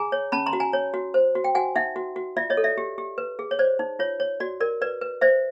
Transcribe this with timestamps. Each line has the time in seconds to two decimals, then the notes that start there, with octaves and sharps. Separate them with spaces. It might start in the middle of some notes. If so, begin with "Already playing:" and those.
Already playing: G#4 G#5 A#5
0.12 C#5
0.32 C#4 A5 B5
0.46 A#5 C6
0.53 F#4
0.60 G#5 A#5
0.73 C#5
0.94 F#4
1.14 C5
1.35 F#4
1.44 G5
1.55 F#4 F#5 G#5
1.76 D#4 E5 F#5
1.96 F#4
2.16 F#4
2.37 F4 D5 E5
2.50 C#5 D#5
2.57 A4
2.64 D5 E5
2.78 G4
2.98 G4
3.18 B4
3.39 G#4
3.51 C#5
3.59 C5 D5
3.79 D#4
3.99 F4 C#5
4.20 C#5
4.40 F#4 D5
4.60 A#4 D5
4.82 B4 D5
5.01 B4
5.21 C5 D5 E5